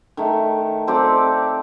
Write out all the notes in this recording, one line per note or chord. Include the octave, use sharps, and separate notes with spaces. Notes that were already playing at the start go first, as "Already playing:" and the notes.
D#3 A3
C4 G4 A4 D5